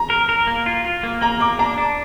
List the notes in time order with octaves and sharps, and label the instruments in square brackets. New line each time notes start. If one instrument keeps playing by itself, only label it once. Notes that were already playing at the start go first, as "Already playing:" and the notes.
Already playing: [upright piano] A#5
[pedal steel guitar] A#4
A#4
A#3
F4
F4
A#3
[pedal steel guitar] A#3 [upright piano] A#5
[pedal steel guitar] A#3 [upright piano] D6
[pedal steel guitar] D4 [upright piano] A#5
[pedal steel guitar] D4